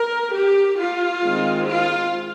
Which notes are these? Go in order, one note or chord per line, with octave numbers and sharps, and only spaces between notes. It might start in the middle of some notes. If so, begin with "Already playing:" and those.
Already playing: A#4
G4
F4
D#3 G#3 C4
F4